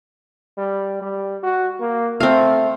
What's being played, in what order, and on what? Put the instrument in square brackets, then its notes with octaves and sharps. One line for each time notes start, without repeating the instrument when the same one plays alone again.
[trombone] G3
G3
F#4
A#3
[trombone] A3 [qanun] C4 F5